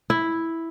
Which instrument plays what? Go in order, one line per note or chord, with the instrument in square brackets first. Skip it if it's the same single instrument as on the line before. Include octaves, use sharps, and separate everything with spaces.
[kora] E4